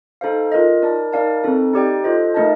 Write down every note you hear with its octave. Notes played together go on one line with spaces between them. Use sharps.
D#4 A4 C5 F5
F4 A#4 D#5
D#4 A#4 D5 A5
D#4 A#4 D5 F5 A5
C4 D#4 A4
D#4 G4 D5 G5
F4 A4 C5 D#5
A3 D#4 A#4 D#5 A5